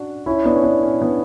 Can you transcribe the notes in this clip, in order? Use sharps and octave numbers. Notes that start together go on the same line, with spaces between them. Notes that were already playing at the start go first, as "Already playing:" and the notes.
Already playing: C#4 D4 F#4
C#4 E4
B3 D4
C#4
B3 D4
C#4
B3 D4